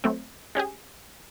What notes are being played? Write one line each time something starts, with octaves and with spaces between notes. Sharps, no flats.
F#3 A3 C4
G#3 C#4 G4 G#4